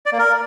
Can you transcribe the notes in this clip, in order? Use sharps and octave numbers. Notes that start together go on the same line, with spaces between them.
D5
A#3
A#4